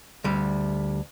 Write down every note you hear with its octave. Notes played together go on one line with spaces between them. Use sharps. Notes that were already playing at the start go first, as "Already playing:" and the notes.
D2 G3